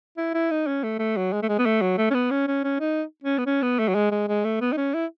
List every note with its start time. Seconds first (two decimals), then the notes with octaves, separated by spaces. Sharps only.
0.17 E4
0.34 E4
0.51 D#4
0.67 C#4
0.83 A3
0.99 A3
1.17 F#3
1.33 G#3
1.42 A3
1.49 G#3
1.59 B3
1.66 A3
1.81 F#3
1.98 A3
2.10 C#4
2.14 B3
2.31 C#4
2.48 C#4
2.64 C#4
2.80 D#4
3.24 C#4
3.38 B3
3.46 C#4
3.63 B3
3.79 A3
3.88 F#3
3.95 G#3
4.12 G#3
4.28 G#3
4.45 A3
4.61 B3
4.73 D#4
4.77 C#4
4.94 E4